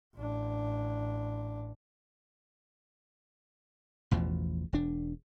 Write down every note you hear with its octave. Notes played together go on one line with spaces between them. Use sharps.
A1 D4
A1 E2 B2 F3
E1 D4